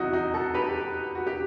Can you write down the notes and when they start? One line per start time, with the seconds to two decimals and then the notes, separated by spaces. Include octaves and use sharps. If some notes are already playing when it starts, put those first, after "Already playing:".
Already playing: E2 C3 F#3 D#4 E4 F#4
0.13 D#4 F#4
0.34 F#4 A4
0.54 G4 B4
1.15 F#4
1.27 G4